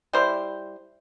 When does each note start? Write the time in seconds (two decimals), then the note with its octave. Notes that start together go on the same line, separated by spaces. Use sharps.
0.13 G3 E4 C5